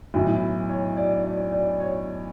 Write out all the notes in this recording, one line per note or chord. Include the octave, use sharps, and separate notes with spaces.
B1 A2 E3 E4
C#5
D5
D5
D5
C#5